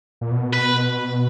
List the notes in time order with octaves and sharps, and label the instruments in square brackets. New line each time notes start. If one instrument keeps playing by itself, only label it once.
[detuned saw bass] A#2
B2
[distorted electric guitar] B4